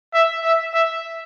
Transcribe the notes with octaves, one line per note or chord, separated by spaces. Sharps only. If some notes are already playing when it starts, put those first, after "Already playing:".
E5
E5
E5